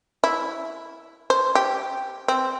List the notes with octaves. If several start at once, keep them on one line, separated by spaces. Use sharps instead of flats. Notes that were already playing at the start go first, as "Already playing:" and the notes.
E4
C5
G4
C4